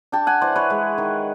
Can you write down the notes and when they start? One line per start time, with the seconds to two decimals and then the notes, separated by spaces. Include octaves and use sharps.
0.12 D4 G5 A5
0.27 F#5 G#5
0.41 E3 C5 D5
0.55 B4 C#5
0.70 G#3
0.98 D#3